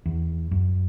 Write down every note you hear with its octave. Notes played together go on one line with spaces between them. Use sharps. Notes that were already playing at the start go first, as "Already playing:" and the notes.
E2
F#2